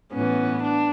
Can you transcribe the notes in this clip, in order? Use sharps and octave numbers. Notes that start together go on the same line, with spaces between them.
A2 E3 B3 C#4
D4